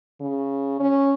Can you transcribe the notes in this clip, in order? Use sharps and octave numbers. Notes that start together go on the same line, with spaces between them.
C#3
C#4